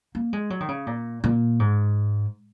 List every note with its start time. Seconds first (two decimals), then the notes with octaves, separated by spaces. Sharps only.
0.15 A#3
0.33 G#3
0.50 F#3
0.60 D#3
0.68 C#3
0.87 A#2
1.24 A#2
1.60 G#2